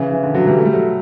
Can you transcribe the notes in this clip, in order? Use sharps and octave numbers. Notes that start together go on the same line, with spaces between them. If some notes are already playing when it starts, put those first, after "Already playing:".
Already playing: C#3 E3
E3
D3
D3 F#3
E3 G3
A3
G3
F#3 A3